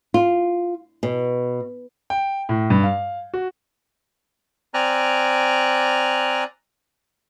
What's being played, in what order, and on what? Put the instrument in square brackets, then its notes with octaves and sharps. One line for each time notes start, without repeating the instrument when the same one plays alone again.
[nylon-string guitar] F4
B2
[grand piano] G5
A2
G2
F5
F#4
[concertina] C4 D5 G#5 A#5 F6 F#6